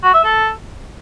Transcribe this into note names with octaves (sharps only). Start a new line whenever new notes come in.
F#4
E5
A4